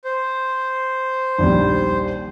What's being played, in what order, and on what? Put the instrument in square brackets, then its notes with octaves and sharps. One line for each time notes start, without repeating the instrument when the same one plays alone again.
[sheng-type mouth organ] C5
[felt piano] A#1 D#2 G3